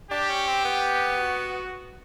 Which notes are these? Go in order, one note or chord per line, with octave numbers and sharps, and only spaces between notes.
D4 G4
C#4
C4
B3
F#4